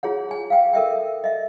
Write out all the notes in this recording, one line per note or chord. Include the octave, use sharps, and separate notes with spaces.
F4 G#4 C#5 F#5
G#4 G#5
F5 G5
A4 A#4 E5 G5
D#5 E5